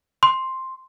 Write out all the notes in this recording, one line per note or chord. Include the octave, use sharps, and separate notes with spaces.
C6